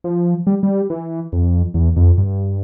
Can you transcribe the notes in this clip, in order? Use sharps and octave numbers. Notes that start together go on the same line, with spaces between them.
F3
G3
G3
E3
F2
E2
F2
G2